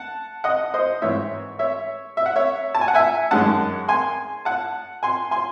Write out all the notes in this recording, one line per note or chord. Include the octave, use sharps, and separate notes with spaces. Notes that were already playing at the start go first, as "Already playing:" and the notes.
Already playing: F#5 A5
D#5 F#5
C5 D#5
G#2 E3 C4 C#5 E5
C#5 E5
E5
F#5
C#5 E5
A5
G#5
F#5
E5 G#5
F#2 D#3 G#3 C#4 F#5 A5
G#5 C6
F#5 A5
G#5 C6
G#5 C6